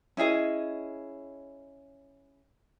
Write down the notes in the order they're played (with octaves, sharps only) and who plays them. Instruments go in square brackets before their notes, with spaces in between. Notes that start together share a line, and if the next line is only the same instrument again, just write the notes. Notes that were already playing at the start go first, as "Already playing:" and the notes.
[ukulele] C#4 E4 G#4 D#5